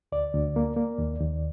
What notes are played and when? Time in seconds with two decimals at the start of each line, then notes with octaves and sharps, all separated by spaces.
0.12 D2 D5
0.34 D2
0.56 A#3
0.77 A#3
0.98 D#2
1.20 D#2